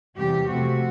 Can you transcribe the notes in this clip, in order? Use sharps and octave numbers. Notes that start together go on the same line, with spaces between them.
E2 C3 E3 G3 G4
C3 F3 A3 C4 F#4